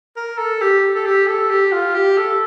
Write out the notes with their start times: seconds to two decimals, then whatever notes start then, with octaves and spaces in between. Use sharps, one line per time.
0.17 A#4
0.39 A4
0.61 G4
0.96 A4
1.06 G4
1.27 A4
1.50 G4
1.72 F4
1.95 G4
2.17 A4